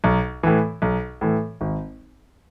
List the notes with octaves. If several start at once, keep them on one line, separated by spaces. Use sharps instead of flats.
B1
A2 E3
B1
A2 E3
G#1